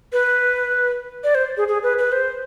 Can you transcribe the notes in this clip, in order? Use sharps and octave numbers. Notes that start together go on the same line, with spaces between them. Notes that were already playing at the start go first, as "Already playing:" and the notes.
B4
D5
C5
G#4
G#4
B4
B4
C5